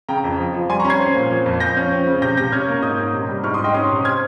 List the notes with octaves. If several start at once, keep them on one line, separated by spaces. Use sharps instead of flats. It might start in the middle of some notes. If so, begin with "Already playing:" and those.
C#3 G5 A#5
F2
F3
F3
G3 G#5 C6
A#5 C#6
C#4
G#6 C7
C4
A#2
F3
F2
F3 G6 A#6
C#4
C4
C#3
C3 G6 A#6
C3 G6 A#6
C#4 F6 G#6
A#3
G#2 D#6 G6
C#4
C3
G3
G#2 C#6 F6
C6 D#6
G#2 D#5 G5
C#4 C6 D#6
C3
C4 F6 G#6